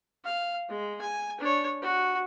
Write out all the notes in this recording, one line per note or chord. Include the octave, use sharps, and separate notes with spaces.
F5
G#3
G#5
D4 C#5
F#4